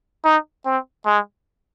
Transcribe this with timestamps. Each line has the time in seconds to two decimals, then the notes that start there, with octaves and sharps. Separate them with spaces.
0.24 D#4
0.65 C4
1.06 G#3